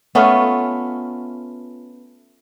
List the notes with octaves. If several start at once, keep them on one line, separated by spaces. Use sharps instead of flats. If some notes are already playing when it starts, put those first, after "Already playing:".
A3 B3 C#4 F4